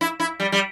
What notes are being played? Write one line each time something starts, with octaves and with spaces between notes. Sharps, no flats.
E4
E4
G3
G3